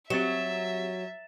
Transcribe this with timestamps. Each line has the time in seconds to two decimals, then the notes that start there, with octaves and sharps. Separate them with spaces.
0.10 F#3 C4 G4 E5 A6 E7